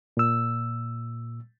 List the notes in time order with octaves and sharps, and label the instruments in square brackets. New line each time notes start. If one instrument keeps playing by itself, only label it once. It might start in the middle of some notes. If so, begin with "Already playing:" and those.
[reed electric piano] A#2 E6